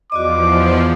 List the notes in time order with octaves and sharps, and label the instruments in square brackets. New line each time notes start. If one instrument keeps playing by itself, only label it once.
[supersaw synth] E2 F3 [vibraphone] F#4 D5 D#5 [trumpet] D6